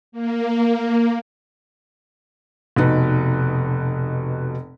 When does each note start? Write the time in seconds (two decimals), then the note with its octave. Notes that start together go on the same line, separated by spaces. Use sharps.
0.12 A#3
2.76 F1 B2 D#4 B4